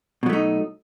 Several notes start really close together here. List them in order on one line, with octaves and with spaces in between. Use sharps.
B2 F#3 A3 D#4